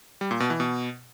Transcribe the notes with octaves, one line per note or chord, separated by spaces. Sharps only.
G3
A#2
B2
E3
B2